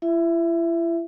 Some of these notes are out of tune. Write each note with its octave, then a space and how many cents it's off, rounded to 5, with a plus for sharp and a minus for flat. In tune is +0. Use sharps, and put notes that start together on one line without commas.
E4 +40 E5 +10